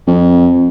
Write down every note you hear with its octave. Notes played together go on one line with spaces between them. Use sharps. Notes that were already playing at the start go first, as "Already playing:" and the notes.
F2